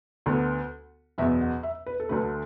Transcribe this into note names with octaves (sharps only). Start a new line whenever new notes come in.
D2 D3 B3
F#1 E2 B2 B3 E5
F#5
E5
B4
A4
D2 D3 F#3 A3 B4